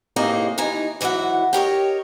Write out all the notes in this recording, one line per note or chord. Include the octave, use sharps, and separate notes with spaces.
A2 C3 A#3 D#4 G#4 D#5
D#2 E3 D#4 G#5
G#2 E3 F#3 E5 F#5
G4 A#4 C#5 D#5